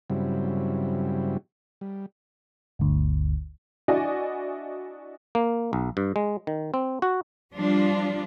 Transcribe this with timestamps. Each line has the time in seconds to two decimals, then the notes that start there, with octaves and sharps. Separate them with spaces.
0.10 G2 C#3 F#3 G3 C4 E4
1.81 G3
2.79 G1 D2
3.88 D4 E4 F#4 D5 D#5 G#5
5.35 A#3
5.73 B1
5.97 G2
6.16 G#3
6.47 D#3
6.74 C4
7.02 F#4
7.55 F3 G3 D4 F4